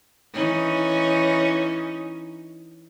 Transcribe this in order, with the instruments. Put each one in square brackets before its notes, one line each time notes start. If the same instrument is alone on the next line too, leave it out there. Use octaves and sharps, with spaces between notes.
[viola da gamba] E3 C#4 D#4